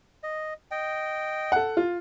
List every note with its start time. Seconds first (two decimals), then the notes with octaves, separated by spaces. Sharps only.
0.23 D#5
0.71 D#5 G5
1.52 A4 F#5
1.77 F4